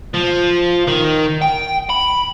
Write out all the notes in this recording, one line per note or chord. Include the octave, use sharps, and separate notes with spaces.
F3
D#3
G5
B5